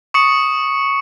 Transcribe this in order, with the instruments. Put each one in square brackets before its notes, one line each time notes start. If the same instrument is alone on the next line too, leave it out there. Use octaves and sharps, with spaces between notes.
[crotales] C#6 D#6 C#7